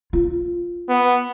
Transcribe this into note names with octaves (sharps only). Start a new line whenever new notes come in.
F4
B3